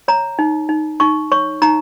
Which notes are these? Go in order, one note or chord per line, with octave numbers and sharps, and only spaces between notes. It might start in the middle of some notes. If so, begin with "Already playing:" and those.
C#5 A#5
D#4
D#4
D#4 C#6
C#5 C#6
D#4 A#5